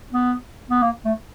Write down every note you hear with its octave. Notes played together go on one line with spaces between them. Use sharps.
B3
B3
A#3
A3